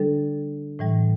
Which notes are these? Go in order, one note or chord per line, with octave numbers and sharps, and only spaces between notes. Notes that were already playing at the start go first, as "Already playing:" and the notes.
Already playing: D3 G3 D4 A4
A2 E3 G3